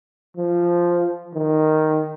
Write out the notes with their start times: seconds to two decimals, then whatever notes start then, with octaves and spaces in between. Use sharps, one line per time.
0.37 F3
1.35 D#3